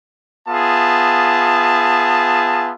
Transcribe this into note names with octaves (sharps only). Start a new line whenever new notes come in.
B3 F4 G#4 E5 A5